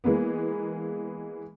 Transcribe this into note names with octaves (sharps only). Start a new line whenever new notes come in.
E3 G#3 A#3 B3